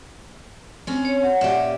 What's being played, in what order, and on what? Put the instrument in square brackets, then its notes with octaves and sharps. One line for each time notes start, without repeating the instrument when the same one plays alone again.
[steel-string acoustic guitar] C4 C#4
[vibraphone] C#5
[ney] F#5
[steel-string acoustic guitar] A#2 C#4 G4 [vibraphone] E5